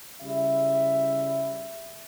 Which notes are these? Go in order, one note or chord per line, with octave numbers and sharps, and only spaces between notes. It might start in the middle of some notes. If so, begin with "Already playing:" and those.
C#3 G3 E4 E5